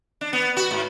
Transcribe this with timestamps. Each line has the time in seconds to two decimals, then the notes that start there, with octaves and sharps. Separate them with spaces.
0.21 D4
0.33 B3
0.57 F#4
0.71 G#2